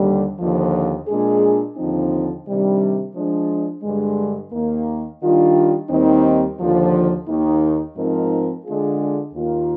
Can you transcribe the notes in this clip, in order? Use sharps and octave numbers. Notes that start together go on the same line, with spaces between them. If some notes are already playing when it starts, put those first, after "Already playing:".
Already playing: D#2 D3 G3
D#2 D3 F3
A#2 G#3 D4 G#4
D#2 D3 F3 C4 D#4
C3 D#3 G3 D4
F3 G#3 D4
G2 D3 G#3
D#2 D#3 A#3
D#3 G3 D4 F4
D#2 D#3 G3 C4 D#4
D#2 D3 F3
D#2 D#3 A#3 D#4
G#2 F3 C4 D#4 A#4
D3 G#3 D4 F4 G#4
D#2 D#3 A#3 F4 A#4